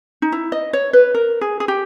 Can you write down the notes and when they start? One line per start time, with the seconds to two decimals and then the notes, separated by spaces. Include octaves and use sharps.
0.22 D#4
0.32 E4
0.52 D#5
0.73 C#5
0.93 B4
1.15 A#4
1.41 G#4
1.60 G#4
1.68 G4